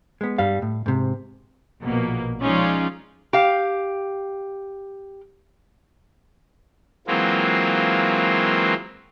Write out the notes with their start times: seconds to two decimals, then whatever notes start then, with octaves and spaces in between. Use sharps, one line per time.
0.21 G#3 B3
0.38 G2 G3 F5
0.62 A2
0.86 G#2 C3
1.81 A#1 B2 A#3
2.42 F3 G#3 C#4 D#4 F4 D5
3.33 G4 F5
7.07 E3 F#3 G#3 A#3 C4 F4